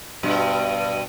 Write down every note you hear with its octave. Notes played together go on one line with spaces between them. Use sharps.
G2 B2